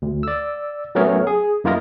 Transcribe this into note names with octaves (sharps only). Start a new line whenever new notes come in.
D2
D5 E6
F#3 A3 B3 C#4 A#4 C#5
G#4
F#2 A#3 E4 F4 A#4 D#5